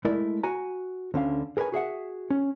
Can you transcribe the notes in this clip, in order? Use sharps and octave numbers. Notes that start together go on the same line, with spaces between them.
G#3 A3 E4 A#4 D5
F#4 G#5 A#5
D2 D3 C#4 F5
G#4 A#4 B4 C#5 G#5
F#4 G#4 E5 F#5
C#4